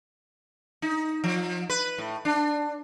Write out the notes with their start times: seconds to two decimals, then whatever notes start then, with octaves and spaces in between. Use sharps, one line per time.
0.82 D#4
1.24 F3
1.70 B4
1.98 A2
2.25 D4